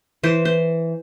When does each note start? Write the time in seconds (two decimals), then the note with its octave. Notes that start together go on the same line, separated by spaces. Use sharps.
0.23 E3 C5
0.45 C5